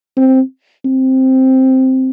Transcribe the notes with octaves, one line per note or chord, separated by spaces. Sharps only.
C4
C4